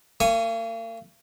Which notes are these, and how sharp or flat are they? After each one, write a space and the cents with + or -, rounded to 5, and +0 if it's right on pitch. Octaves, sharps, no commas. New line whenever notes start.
A#3 -40 G#5 +0 C#6 +0